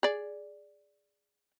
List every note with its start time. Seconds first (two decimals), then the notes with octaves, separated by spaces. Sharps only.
0.03 G#4 D5